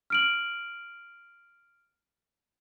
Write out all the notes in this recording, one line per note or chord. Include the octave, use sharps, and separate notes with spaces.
F6 D7 F#7